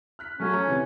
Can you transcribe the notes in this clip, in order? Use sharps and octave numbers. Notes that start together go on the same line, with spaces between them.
F6 F#6 B6
F#3 A3 C#4 F#4
A#5
C3 E3